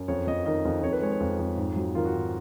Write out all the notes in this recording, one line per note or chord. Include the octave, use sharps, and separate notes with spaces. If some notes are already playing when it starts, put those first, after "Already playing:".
Already playing: F#2
F2 C#5
F2 D#5
D#3 D#5
F2
F2 C#5
B4
G#3 C#5
C#5
F2
F2
G#2
F#3
D#3 F4
F#4
G#2